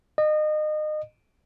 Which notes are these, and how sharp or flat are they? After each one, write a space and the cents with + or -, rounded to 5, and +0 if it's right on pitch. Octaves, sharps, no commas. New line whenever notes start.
D#5 -30